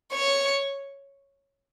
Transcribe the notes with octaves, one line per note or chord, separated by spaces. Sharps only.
C#5